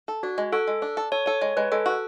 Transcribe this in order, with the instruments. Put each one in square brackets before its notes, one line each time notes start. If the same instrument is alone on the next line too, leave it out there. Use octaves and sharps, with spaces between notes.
[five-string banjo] A4
[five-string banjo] D4 [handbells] F#4
[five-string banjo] G#3
[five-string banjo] F#4 [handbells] A4
[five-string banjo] G#3
D4
A4
[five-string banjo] A4 [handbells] C#5
[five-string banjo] A4 [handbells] C#5
[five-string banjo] G#3 [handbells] C#5
[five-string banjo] G#3 [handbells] B4
[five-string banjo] G#3 [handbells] A4
[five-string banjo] F#4